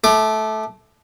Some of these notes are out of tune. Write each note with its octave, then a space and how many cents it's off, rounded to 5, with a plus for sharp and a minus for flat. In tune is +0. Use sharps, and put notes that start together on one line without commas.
A3 -15 D6 +20